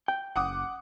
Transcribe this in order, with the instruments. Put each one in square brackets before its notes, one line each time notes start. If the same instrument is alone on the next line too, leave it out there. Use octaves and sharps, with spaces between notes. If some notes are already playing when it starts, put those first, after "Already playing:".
[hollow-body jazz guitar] G5
[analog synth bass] F#1 [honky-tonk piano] F#5 D6 D#6